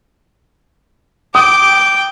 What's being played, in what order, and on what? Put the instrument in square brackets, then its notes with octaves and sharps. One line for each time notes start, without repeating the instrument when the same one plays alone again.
[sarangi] G5 [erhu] D6 [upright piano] D#6